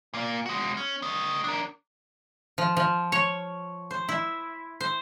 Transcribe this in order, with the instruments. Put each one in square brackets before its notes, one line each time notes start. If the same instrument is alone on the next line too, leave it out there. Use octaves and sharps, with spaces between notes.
[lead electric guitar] A#2 A#3
G#3 F#4
C#4
A3 D#5
D4 A#4
[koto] F3
F3
C#5
C5
E4
C5